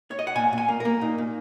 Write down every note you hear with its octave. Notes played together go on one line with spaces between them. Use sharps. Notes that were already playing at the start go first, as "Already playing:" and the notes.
C#5
D#5
F#5
A#2 G#5
A#2
G#5
A#3
A#3 A#4
A#2 D#4
A#2